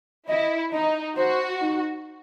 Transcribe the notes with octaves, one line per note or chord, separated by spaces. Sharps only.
E4 D#5
D#4 D#5
F#4 C5
D#4